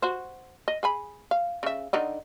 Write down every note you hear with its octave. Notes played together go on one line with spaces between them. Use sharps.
F#4 C5
D#5
G#4 G#5 B5
F5
C#3 E5
D3 D#3 D#4